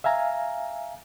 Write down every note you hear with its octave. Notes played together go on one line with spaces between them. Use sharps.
E5 F5 G#5 A#5